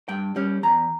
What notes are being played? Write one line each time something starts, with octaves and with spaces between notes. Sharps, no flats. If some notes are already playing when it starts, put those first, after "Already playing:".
G2 G5
G3 C#4
E2 A#5